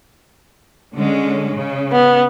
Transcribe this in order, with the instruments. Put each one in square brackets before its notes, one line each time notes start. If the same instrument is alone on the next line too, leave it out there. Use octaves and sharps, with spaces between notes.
[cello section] D3 G#3 C#4
C#3
[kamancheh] B3